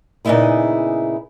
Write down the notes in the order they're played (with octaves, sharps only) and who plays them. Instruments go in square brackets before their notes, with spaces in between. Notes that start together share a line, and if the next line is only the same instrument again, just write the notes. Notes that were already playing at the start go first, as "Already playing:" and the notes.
[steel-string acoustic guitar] A#2 C#3 B3 D#4 E4 G#4